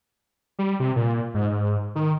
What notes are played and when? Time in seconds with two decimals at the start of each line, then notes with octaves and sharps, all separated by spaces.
0.59 G3
0.80 C3
0.96 A#2
1.34 G#2
1.95 D#3